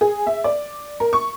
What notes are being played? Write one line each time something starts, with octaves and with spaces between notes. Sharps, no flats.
G#4
E5
D5
A#4
C#6